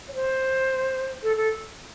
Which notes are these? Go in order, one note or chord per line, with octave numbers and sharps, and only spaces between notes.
C#5
C5
A4
A4